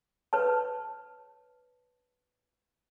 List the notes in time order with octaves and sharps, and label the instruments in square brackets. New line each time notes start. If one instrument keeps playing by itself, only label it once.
[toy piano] B4 C#5 A5